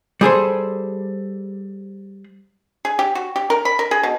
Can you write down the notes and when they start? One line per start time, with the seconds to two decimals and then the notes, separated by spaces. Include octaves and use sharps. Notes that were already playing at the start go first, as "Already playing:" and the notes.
0.21 G3 G#4 A4 C5
2.85 G#4
2.99 G4
3.15 F#4
3.36 G4
3.50 A#4
3.65 B5
3.79 A#4
3.91 G#4
4.03 B2